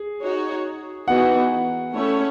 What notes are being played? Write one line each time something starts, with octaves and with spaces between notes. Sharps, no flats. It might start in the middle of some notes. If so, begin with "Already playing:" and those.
Already playing: G#4
D#4 F#4 C#5
E3 B3 D#4 F#4 F#5
A3 C#4 E4 A4 C#5